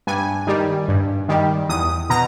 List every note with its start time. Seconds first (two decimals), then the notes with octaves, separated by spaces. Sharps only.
0.07 G2 G#5
0.47 D#3 G3
0.88 G2
1.29 D#3 G3
1.69 E2 D#6
2.10 B2 A#5